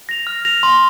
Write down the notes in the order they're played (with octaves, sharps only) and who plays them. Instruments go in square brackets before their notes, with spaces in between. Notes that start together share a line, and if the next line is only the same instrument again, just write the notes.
[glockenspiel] A#6 F7
F6
A#6 F7
C6